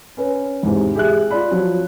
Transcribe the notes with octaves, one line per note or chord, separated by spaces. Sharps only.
C#4 B4
E2 G#2 C3
G4 G#4 E5 F#6
F4 D5 B5
F3 F#3